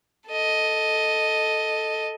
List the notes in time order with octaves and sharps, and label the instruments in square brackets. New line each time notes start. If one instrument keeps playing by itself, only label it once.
[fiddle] A4 D#5